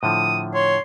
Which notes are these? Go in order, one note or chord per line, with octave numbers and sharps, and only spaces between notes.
A2 D3 F3 D#6
C#5 C6